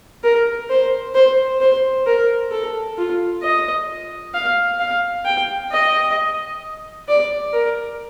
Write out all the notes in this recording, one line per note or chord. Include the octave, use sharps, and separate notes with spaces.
A#4
C5
C5
C5
A#4
A4
F4
D#5
F5
F5
G5
D#5
D5
A#4